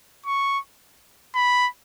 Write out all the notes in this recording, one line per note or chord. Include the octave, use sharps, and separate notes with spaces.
C#6
B5